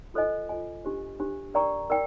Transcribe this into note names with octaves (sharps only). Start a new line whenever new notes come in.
F4 A4 C5 D#5 G#5
F4 A4 C5 D#5 G#5
D4 G4 C5
D4 G4 C5
A#4 D5 G5 A#5 C#6
A#4 D5 G5